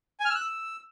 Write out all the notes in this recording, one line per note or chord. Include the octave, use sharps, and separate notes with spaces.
G#5
F6
E6
F#6
E6